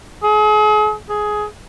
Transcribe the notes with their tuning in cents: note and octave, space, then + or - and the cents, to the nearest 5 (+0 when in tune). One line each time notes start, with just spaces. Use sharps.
G#4 +40
G#4 +15